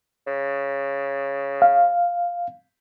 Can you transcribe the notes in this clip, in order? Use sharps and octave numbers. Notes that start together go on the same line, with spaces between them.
C#3
F5